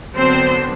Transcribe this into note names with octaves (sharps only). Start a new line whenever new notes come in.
D3 F#3 B3 C4 D4 C5